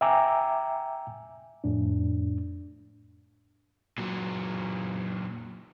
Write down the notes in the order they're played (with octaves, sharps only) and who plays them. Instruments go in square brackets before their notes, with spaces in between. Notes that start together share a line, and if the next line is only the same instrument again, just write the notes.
[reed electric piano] E5 G5 G#5 A#5 D6 E6
F2 A2 D4
[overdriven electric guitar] A#2 F#3